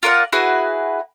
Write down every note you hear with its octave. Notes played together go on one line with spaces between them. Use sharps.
F4 A#4 D5 F#5
E4 F#4 G#4 B4